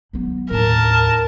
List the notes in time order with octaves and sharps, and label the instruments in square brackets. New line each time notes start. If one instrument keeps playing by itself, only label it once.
[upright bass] F#3 B3
[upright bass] D#2 A2 [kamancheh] A#4 A5